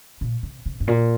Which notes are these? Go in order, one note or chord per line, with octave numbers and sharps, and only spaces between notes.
A#2
C3
C3
G2
A#2